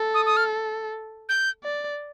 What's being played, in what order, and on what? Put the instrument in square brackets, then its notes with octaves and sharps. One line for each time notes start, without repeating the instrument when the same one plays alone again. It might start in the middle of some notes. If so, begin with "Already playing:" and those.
Already playing: [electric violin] A4
[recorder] D#6
D#6
F6
G6
[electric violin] D5